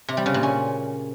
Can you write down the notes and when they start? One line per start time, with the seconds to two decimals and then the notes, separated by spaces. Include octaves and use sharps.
0.08 C3
0.17 G3
0.26 C#3
0.34 A#2
0.43 C#4